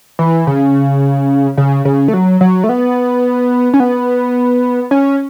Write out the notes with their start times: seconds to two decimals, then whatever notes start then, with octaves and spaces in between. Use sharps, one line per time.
0.19 E3
0.47 C#3
1.58 C#3
1.85 C#3
2.08 A3
2.14 F#3
2.41 F#3
2.64 A3
2.69 B3
3.74 C#4
3.80 B3
4.91 C#4